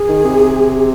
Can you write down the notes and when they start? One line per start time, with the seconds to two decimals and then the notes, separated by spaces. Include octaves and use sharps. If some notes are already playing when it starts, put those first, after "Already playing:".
Already playing: G#4
0.09 D#3
0.24 C3